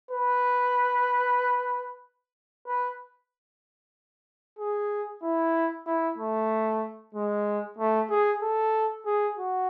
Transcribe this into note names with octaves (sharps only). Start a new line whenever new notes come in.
B4
B4
G#4
E4
E4
A3
G#3
A3
G#4
A4
G#4
F#4